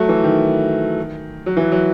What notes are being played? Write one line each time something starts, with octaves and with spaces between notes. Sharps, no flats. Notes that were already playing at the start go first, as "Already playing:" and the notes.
Already playing: F#3 A3
E3
D#3
F#3
E3
F#3